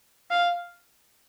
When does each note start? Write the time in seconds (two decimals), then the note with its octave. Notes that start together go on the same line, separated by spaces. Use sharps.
0.31 F5